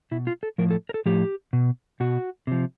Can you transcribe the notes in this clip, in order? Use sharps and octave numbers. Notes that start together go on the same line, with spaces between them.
B2 E4
F4
A4
A2 F3 A#4
A4
A#4
A4
A2 F3 G4
B2
B2 F#4
C3 F3